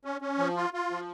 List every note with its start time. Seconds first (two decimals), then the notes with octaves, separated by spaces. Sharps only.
0.05 C#4
0.21 C#4
0.38 F3
0.57 F4
0.74 F4
0.91 F3